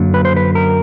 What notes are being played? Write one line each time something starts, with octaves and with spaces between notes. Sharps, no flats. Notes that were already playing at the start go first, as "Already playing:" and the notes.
Already playing: F#2 D3 F#3 A#3
B4
C5
B4
A#4